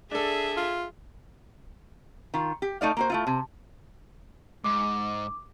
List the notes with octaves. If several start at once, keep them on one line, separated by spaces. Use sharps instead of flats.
D4 G#4 A4 E5
F4
D#3 F4
G4
A3 D#4 D5 F5
A#3 F#4 C5
A3 E4 F4
C3
G#2 D6